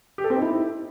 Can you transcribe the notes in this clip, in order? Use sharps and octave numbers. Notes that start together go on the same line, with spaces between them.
G4
A4
C4
D#4
E4